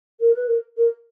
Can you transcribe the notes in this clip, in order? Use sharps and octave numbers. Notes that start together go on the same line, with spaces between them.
A#4
B4
A#4
A#4